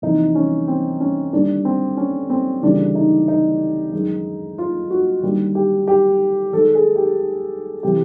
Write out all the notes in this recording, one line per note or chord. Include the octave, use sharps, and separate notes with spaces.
E2 C3 F3 A#3 D#4
C#4
C4
C#4
D#2 D3 G3 A#3 D4
C4
C#4
C4
D2 C#3 E3 G3 A#3 D4
D#4
D#4
F#2 D#3 G#3
F4
F#4
D#2 D3 G3 A#3
G4
G4
D#2 D#3 G#3 A4
G#4
G4
C3 E3 G4